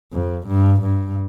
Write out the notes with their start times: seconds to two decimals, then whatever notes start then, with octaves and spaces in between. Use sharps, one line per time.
0.13 F2
0.47 G2
0.82 G2